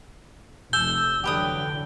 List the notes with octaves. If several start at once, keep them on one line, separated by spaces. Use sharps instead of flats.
F1 A4 E6 G6 G7
D3 E3 F#3 G4 B4 G5 D#6